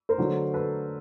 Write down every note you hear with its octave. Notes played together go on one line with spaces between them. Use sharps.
A#4 C5
D3 F#3 A3
A4 B4